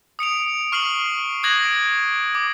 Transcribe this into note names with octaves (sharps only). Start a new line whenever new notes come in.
D#6 C#7 D7 F7
C#6 F6 C7 D7 F#7
D6 D#6 F#6 G#6 A#6 F#7
D7
D6